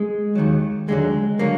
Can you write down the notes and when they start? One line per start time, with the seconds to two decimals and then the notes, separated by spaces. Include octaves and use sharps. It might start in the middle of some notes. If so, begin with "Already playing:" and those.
Already playing: G#3
0.35 D#2 D#3 F#3
0.88 D#2 D3 F#3 G#3
1.39 D3 F#3 A#3